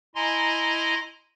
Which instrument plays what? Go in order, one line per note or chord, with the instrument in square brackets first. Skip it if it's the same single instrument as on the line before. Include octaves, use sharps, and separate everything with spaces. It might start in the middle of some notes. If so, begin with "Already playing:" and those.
[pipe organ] E4 D#5 G#5 A#5 C6